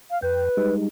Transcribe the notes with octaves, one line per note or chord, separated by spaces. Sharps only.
F5
F2 B4 G5
G3 G#3 D#4